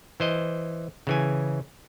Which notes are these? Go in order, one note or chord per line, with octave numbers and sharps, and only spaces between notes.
E3 C5 D#5
C#3 E3 G#5